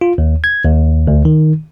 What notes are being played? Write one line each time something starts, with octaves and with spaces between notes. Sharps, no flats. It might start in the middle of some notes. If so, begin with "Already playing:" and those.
F4
D#2
G#6
D#2
D2
D#3